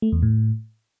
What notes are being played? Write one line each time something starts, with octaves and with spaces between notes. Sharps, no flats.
A3
E2
A2